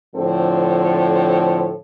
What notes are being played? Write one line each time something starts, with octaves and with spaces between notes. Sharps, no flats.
A2 D3 F3 C4 A4